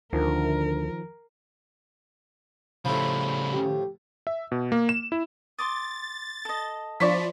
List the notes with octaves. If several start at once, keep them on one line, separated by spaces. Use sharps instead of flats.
D2 D3 D#3 F3 A#4
A2 C#3 F3 G3 B5
G4
E5
B2
A#3
E7
E4
C6 D6 D#6 A6
A4 D#5
F3 E4 C5 D5 C#6 B6